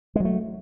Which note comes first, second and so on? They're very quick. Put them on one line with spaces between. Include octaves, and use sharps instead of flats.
G#3 F#3 A3